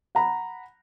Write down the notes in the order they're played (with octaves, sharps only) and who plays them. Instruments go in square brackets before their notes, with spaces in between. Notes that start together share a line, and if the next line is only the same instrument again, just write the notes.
[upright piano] F#5 A#5 B5